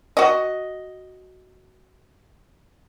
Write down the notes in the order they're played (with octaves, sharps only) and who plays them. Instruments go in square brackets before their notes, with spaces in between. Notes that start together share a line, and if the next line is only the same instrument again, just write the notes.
[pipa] F#4 D#5